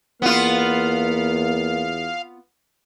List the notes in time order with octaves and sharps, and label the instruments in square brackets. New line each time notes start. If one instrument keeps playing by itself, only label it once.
[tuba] E2 [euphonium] A#3 [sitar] B3 F4 [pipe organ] F5